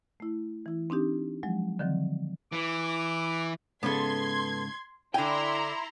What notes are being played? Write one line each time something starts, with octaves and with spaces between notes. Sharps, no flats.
A3 E4
E3 E4
C4 D4 D#4 G4
F3 F#3 G#3
D3 D#3 F3 F#3 C4
E3 D6
G#2 C#3 B3 A4 C6 G#6
D3 E4 G5 G#5 A#5 C6